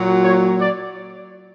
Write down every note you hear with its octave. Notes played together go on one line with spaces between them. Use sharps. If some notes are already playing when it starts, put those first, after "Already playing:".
Already playing: A#2 F#3
C#5
D5